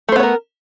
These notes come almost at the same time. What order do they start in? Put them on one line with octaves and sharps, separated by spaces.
A3 C5 B3 C#5 A#4